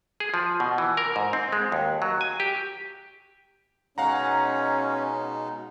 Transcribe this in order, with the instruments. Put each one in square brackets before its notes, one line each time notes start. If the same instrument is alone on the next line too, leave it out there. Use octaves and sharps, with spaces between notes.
[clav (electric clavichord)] G#4
F3
B2
E3
A#4
G#2
C4
G#3
D#2
F#3
G#5
G4
[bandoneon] B2 G#3 D#4 [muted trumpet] C#4 [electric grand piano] F5 F#5 A#5